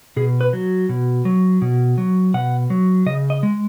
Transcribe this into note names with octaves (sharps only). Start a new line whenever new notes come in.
B2 G#4
B4
F#3
B2
F#3
B2
F#3
B2 F#5
F#3
C#3 D#5
D#5
G#3